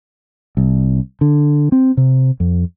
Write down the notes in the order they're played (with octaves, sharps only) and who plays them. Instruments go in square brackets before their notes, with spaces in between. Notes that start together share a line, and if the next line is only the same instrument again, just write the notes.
[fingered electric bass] C2
D3
C4
C3
F2